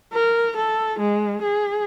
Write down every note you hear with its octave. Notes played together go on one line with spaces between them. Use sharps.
A#4
A4
G#3
G#4